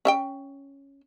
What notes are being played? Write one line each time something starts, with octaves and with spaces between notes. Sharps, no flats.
C#4 E5 G5